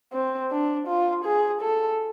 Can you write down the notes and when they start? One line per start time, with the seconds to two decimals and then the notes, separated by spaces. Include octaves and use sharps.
0.13 C4
0.51 D4
0.87 F4
1.25 G#4
1.61 A4